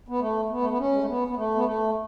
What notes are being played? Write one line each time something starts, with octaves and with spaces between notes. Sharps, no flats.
B3
A3
A3
B3
A3
B3
C#4
G#3
A3
B3
B3
A3
B3
A3